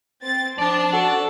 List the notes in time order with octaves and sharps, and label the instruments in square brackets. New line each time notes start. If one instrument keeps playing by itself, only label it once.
[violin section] C4 A6
[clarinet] F3 [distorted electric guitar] D4 D5 [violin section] A5
[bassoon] F#4 [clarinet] A4